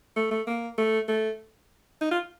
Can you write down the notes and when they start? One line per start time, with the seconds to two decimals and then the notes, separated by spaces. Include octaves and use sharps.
0.16 A3
0.31 A3
0.47 A#3
0.78 A3
1.08 A3
2.01 D#4
2.11 F4